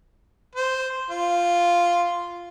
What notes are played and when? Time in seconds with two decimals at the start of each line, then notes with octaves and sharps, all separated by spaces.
0.55 C5
1.10 F4